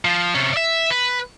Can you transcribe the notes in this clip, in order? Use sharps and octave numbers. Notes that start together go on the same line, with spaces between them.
F3
C3 C#4
D5 E5
B4